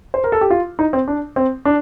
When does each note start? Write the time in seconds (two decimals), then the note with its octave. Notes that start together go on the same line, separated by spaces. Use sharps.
0.14 C5
0.24 A#4
0.32 A4
0.41 G4
0.50 F4
0.79 D#4
0.93 C4
1.08 D4
1.36 C4
1.65 D4